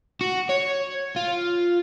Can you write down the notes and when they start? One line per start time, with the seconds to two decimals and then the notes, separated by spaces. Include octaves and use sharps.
0.21 F#4
0.49 C#5
1.16 F4